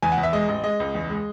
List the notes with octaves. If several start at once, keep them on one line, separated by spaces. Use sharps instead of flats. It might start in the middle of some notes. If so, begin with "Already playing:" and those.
E2 G#5
F#5
E2
E5
G#3 D#5
A1
G#3 D#5
C#2
E2
G#3